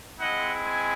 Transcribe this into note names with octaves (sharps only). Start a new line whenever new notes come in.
G#3 C4 E4 D#5 F#5
G#5